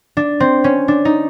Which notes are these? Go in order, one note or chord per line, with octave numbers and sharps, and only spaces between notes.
D4
C4
C#4
D4
D#4